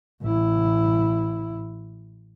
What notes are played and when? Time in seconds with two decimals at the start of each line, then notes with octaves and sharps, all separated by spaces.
0.22 A1 E4